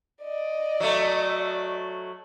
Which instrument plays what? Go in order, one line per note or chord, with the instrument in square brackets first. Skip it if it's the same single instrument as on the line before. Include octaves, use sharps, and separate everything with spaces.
[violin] D5 D#5
[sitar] F#3 A3